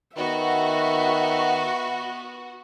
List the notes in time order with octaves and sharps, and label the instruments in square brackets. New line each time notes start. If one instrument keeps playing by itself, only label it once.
[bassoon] D#3 [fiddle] B3 [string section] F#4 [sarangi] E5